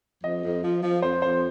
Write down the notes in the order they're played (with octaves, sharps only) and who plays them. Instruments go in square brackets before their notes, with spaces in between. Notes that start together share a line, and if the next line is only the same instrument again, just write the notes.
[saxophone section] F2 [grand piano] D#5
[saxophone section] F2
F3
F3
[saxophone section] F2 [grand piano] C5
[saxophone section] F2 [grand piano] C5